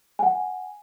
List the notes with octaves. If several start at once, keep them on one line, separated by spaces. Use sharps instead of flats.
F#5 G#5